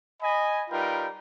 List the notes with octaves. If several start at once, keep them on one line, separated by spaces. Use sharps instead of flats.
D#5 G#5 B5
G3 D#4 F4 A#4 B4 G5